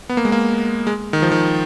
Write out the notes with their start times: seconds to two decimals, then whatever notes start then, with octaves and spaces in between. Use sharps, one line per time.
0.09 B3
0.17 A#3
0.25 G#3
0.32 A#3
0.87 G#3
1.13 D#3
1.22 F3
1.32 D#3